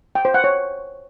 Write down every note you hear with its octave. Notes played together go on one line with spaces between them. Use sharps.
G5
C5
F#5
C#5